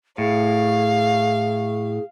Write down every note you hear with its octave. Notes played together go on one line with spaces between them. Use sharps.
A2 G#4 F5